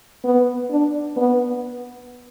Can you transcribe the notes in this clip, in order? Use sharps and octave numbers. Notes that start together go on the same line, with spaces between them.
B3
D4
B3